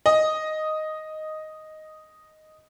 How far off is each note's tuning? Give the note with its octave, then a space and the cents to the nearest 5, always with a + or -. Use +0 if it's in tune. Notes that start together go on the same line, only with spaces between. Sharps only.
D#5 +0